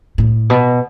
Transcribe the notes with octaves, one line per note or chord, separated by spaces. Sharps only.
A2
B2